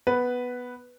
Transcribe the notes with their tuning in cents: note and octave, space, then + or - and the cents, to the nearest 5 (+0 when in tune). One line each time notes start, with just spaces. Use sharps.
B3 +0 B4 +0